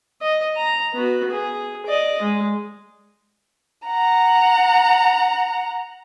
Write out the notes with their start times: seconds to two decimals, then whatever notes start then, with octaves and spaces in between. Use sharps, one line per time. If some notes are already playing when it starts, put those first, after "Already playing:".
0.22 D#5
0.56 A#5
0.94 B3 F#4
1.31 G#4
1.86 D5 D#5
2.22 G#3
3.87 F#5 A#5